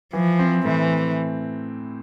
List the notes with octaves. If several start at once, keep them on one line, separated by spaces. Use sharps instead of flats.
E3 F3
C4
A2 E3